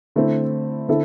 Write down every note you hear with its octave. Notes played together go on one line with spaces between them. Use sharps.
D3 A3 C4 E4
D3 C4 E4 A4 E5